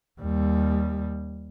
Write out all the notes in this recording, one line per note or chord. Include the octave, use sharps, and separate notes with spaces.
D#2 G3